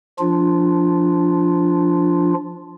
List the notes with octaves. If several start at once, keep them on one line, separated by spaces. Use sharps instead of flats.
F3 D4 F4